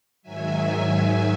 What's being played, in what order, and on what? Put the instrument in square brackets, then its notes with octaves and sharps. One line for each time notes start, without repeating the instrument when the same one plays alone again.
[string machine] G#2 D#3 F#3 E5 G#5